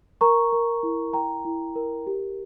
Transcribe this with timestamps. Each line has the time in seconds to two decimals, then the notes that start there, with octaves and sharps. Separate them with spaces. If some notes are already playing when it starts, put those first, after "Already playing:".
0.21 A#4 A#5 C#6
0.52 A#4
0.83 E4
1.13 E4 G5 A#5
1.45 E4
1.76 A#4
2.07 G4